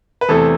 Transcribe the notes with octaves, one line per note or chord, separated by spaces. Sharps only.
B4
E2 C3 E3 A3 A4